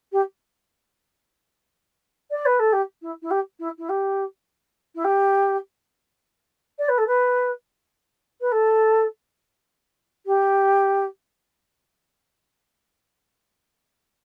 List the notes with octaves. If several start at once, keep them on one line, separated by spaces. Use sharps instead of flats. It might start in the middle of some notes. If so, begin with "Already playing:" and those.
G4
D5
B4
A4
G4
E4
E4
G4
E4
E4
G4
E4
G4
D5
B4
A4
B4
B4
A4
G4